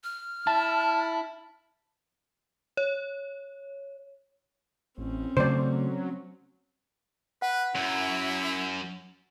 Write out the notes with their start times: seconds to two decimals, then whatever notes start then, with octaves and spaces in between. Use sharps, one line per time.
0.04 F6
0.47 E4 A5
2.77 C#5
4.98 A1 C4 C#4
5.37 C#3 F#3 A3 C5 D5
7.42 B4 F#5
7.75 F#2 E4